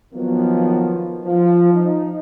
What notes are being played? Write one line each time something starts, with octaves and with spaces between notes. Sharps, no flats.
D#3 F3 F#3 A#3 B3
F3
D#4